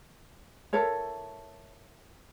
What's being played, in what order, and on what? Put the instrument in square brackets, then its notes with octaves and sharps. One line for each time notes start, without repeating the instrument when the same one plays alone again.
[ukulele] E4 A4 A#4 C#5